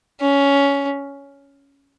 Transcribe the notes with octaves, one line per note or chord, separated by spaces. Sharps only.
C#4